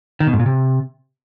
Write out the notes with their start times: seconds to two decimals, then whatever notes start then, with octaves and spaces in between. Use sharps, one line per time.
0.20 D#3
0.27 B2
0.33 G#2
0.40 A#2
0.46 C3